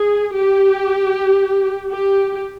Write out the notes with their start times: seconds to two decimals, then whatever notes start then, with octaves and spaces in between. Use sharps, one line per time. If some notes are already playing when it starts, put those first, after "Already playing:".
Already playing: G#4
0.34 G4
1.91 G4